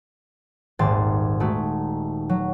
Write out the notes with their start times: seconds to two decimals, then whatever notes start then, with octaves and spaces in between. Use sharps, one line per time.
0.79 D#1 G#1 G#2 C6 A6
1.40 D#3 G#3 A3 F#4
2.29 F#3